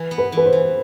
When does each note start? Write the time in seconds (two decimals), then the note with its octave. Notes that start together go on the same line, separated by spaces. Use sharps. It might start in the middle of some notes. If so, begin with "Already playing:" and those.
Already playing: E3
0.11 B3
0.18 B4
0.32 E3 B4
0.45 C5
0.53 E3